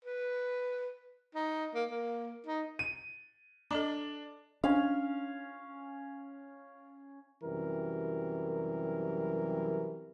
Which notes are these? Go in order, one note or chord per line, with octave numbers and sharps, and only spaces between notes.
B4
D#4
A#3
A#3
D#4
D#7
D4 A4 D#5 A#5
C#4 D4 F5
F#2 C3 E3 F#3 G3 A#4